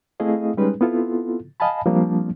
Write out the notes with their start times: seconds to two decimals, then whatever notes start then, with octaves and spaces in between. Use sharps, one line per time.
0.20 A3 C4 E4 G#4 D#5 F5
0.57 G3 G#3 C#4 D#4 G#4 B4
0.81 B3 C4 E4 F4 A4
1.60 D#5 F5 G#5 A5 B5
1.86 F3 G3 A#3 C4 D4